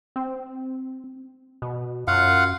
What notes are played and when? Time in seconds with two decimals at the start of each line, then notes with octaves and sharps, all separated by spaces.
0.16 C4
1.62 B2
2.07 F#2 F4 F5 F#5